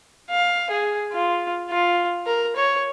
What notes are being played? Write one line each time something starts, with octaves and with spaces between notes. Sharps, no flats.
F5
G#4
F4
F4
A#4
C#5